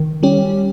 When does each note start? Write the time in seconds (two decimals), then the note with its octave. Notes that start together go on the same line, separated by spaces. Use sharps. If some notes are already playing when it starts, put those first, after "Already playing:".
Already playing: D#3
0.23 G3 C#4 G4